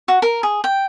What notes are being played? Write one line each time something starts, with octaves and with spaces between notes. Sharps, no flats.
F#4
A#4
G#4
G5